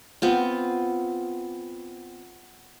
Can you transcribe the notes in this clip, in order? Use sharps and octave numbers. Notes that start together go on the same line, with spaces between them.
B3 C4 F4